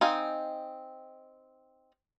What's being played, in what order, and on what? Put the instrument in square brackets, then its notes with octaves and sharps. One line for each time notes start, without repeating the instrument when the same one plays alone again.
[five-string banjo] C4 D#4 F5 G#5